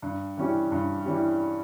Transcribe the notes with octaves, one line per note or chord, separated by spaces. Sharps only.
G2
E3 G3 C#4 G4
G2
E3 G3 C#4 G4